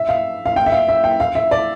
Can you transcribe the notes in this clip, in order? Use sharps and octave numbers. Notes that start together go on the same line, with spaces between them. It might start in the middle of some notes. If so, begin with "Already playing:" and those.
Already playing: E5
F5
F5
G5
E5
F5
E5
G5
F5
E5
D5